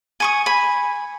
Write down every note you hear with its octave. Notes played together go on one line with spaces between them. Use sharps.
G#5 C#6 D#6
G#5 B5